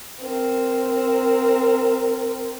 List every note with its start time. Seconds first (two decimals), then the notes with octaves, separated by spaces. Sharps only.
0.21 C4 A#4